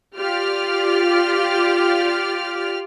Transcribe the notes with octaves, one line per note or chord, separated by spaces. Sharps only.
F4 G4 D5 F6